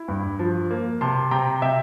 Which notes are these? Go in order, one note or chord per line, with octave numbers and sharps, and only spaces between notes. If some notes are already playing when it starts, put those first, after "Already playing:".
Already playing: E4
G2
F3
A#3
C3 A5 C6
C3 G5 A#5
C3 E5 G5